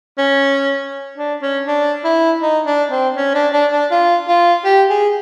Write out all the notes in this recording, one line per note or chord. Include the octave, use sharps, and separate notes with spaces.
C#4
D4
C#4
D4
E4
D#4
D4
C4
C#4
D4
D4
D4
F4
F4
G4
G#4